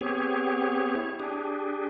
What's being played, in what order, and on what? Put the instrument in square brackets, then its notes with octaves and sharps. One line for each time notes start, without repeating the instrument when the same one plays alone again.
[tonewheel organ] B3 C4 G4 G#4 C#5
E4 C#5
D4 G4 G#4